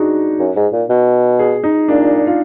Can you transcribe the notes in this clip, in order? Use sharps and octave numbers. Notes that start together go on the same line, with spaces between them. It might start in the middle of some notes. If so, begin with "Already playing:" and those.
Already playing: D4 D#4 F#4 G#4
F#2
G#2
A#2
B2
G#4
D#4
A#2 D4
F4